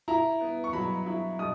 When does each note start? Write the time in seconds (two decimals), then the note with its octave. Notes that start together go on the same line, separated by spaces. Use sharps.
0.08 E4 A#5
0.41 B3
0.64 C#6
0.73 F#3 B5
1.06 E4
1.39 B2 D#6